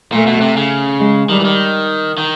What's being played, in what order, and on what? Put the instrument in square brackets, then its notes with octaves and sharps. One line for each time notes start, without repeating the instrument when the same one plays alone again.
[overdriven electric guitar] A#2 [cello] A3
[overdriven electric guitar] B2
C3
C#3
[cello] G#3
[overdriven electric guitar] D#3 [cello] G3
[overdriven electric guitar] E3
D#3
D#3